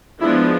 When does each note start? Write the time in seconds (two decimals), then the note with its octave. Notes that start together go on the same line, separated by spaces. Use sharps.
0.21 F3 G#3 B3 D4 E4